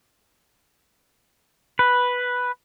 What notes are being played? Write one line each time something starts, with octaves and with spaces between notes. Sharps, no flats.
B4